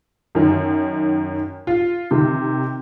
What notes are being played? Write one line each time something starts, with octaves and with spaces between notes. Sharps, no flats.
F#2 D#3
F4
C3 D#3